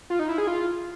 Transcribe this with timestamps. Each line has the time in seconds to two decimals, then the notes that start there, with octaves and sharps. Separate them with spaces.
0.10 F4
0.19 D#4
0.29 E4
0.38 G#4
0.47 F4